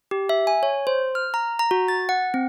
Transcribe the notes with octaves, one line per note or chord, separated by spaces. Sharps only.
G4
E5
G#5
C#5
C5
F6
A#5
A#5
F#4
A6
F#5
C4